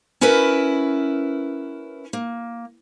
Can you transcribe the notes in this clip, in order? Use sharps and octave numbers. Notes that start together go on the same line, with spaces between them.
C#4 E4 F#4 A#4 B4
A#3